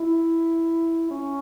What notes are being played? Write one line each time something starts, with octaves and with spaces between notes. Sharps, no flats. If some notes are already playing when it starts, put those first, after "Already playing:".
Already playing: E4
C#4